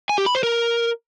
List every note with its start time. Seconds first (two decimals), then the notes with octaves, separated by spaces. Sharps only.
0.09 G#5
0.18 G4
0.26 B5
0.35 C5
0.43 A#4